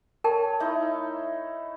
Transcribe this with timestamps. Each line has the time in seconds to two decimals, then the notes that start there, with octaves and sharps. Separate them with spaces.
0.24 A#4 C#5 G5 A5
0.60 A3 D#4 E4